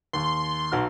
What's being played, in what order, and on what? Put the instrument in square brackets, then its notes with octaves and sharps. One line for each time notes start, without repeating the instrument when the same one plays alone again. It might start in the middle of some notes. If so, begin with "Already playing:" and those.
[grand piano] D#2 [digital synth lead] C6
[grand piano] B1 F#4 F6